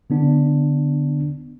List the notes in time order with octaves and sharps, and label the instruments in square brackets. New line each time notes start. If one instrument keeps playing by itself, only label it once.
[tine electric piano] D3 B3 D4